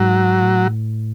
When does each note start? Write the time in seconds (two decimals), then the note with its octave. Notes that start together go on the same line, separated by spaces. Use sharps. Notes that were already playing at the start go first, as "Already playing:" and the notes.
Already playing: G#2 F#3
0.42 A2